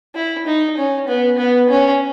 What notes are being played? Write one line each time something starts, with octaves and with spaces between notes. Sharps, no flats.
E4
D#4
C#4
B3
B3
C#4